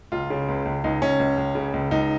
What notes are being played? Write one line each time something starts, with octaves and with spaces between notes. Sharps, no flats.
C#2 F4
C#3
C#2
C#2
C#2 D#4
C#2 C#4
C#2
C#2
C#3
C#2
C#2 D#4